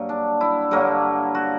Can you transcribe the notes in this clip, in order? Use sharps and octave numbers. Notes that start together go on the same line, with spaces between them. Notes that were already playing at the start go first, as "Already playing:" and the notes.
Already playing: G2 F#3 A#3
D4
E4
G2 D3 F#3 A#3
F#4